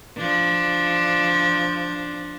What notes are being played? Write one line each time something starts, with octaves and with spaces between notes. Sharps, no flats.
F3 D4